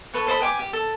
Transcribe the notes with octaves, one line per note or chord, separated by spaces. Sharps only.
A4 B4 C#5
A4 C5 D#5 B5
B4 G5 G#5 D6
G4
A4